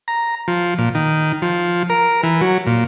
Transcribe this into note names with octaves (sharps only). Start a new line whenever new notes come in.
A#5
F3
A#2
D#3
F3
A#4
E3
F#3
A#2